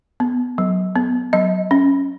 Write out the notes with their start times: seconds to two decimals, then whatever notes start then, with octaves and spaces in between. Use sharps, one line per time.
0.20 B3
0.58 F#3
0.96 B3
1.33 F#3 D#5
1.71 C#4